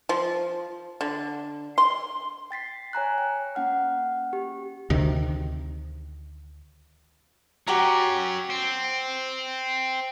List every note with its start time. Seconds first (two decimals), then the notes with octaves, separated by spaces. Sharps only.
0.09 F3
1.01 D3
1.78 C6
2.51 G5 A6 B6 C7
2.93 C#5 G#5 A#5 F#6
3.18 G5
3.55 A#3 C#4 F#5 F6
4.33 G4
4.90 D2 C3 D#3
7.68 F#3 C#4 F#4 G4 A#5
8.50 C4